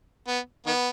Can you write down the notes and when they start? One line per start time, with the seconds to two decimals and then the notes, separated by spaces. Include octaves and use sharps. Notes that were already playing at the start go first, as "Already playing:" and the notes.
0.27 B3
0.66 D#3 B3